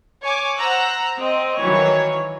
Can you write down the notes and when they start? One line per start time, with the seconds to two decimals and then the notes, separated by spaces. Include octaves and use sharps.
0.22 C#5 G#5 C#6 D6
0.57 C5 F#5 A#5 E6 F#6
1.19 C4 D#5
1.60 D#3 E3 F#3 C#5